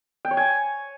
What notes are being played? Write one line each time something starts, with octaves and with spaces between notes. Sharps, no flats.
G5
C#5
G#5